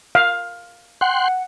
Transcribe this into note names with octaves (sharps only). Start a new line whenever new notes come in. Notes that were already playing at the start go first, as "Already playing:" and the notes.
F5
F#5 G5 C6 F#6